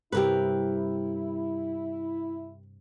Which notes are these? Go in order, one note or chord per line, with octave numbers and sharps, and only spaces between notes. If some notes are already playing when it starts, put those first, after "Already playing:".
G2 C3 E4 G4 A#4 B4 E6